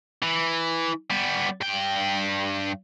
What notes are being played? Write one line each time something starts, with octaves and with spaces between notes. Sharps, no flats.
E3
G3 B3
G2 G5